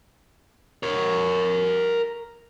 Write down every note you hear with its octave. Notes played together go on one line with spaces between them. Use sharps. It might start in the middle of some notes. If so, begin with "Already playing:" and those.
A#4 C#5